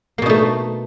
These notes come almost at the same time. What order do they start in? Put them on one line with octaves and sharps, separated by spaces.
A#3 B2 D#4 A3